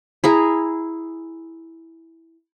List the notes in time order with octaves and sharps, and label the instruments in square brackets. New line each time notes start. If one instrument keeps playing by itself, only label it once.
[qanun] E4 G#4 A#5